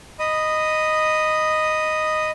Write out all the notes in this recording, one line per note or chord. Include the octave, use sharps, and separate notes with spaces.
D#5 B5 D#6